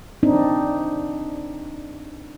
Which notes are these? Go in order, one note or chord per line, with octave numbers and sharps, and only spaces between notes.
C4 D4 D#4